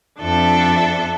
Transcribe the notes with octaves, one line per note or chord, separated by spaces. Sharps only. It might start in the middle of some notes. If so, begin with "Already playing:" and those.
F2 D4 A4 E5